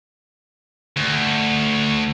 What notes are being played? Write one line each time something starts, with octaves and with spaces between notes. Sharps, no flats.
D2